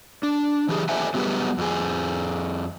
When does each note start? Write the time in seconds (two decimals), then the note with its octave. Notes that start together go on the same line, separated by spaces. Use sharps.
0.23 D4
0.69 E3 G4 G#4
0.89 G4 A4 C5 E5 F#5 G#5
1.14 F#3 G3 B3 G4 G#4 B4
1.58 F2 G#4